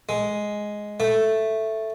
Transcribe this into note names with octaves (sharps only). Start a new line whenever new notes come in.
G#3
A3